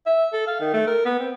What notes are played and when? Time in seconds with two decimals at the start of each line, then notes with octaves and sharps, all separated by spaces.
0.06 E5
0.33 A4
0.47 F5
0.60 D#3
0.74 A3
0.87 A#4
1.05 B3
1.19 C4